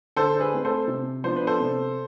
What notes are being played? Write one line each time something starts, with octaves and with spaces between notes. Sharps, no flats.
D3 A4 C5
G#4 B4
A3 C4
A4 C5
C3
F3 B3 D4 C5
B4
A4 C5
C3